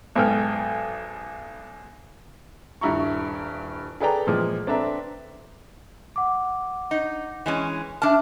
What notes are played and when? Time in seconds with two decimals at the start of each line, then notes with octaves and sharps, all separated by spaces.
0.15 B1 G#2 B3 A4 G5 F6
2.81 D#1 G2 E4 A#5 C#6
4.00 G#4 A4 B4 D5 G5 A#5
4.27 A#2 E3 F3 G#3
4.67 C4 D4 A4 B4 E5 A#5
6.16 F#5 D6
6.91 D#4
7.46 E3 G#3 C#4
8.02 D4 E5 A5 D6 F6